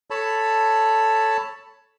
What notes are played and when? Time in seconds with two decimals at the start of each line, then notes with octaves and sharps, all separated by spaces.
0.10 A4 C#5 A5 B5